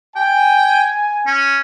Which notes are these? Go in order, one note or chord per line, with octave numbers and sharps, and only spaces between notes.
G5 G#5
C#4